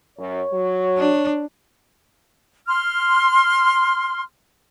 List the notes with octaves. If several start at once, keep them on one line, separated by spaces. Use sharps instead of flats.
F#2 C#5
F#3
D4
C6 F6